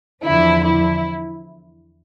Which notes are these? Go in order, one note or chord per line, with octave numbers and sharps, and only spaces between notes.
E2 D3 F3 E4
E4